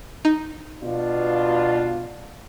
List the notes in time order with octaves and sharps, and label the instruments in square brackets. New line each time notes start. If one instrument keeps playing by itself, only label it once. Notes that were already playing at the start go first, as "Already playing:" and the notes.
[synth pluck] D#4
[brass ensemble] B2 D4 F4